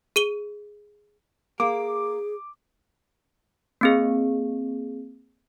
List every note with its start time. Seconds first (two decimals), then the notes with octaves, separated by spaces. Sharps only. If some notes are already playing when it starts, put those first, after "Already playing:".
0.16 G#4 D#7 G7
1.60 A#3 G#4 D6
3.81 A#3 C4 G#4